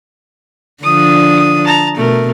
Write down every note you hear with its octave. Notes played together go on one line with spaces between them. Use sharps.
D3 F3 D4 D#6
A5 A#5
B2 A3 A#4